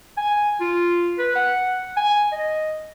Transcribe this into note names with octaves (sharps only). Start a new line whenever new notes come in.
G#5
F4
B4
F#5
G#5
D#5